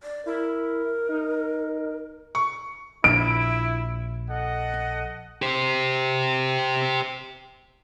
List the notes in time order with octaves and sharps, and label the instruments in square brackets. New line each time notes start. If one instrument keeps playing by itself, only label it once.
[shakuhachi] D5
[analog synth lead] E4 [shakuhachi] A#4
[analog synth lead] D#4
[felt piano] C#6
[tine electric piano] A#1 [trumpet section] E4 [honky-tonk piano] D7
[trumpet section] A4 D#5 F#5
[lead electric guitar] G4 C5